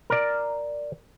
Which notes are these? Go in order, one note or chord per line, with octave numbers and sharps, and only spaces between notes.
A#4 D5